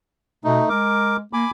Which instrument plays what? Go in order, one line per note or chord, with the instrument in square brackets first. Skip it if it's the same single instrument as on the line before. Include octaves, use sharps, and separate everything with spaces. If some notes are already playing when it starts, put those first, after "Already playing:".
[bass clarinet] B2 [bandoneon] A3 D#4
[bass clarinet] G#3 [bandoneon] A#4 D6
[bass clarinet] A#3 [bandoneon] G#5 B5 D6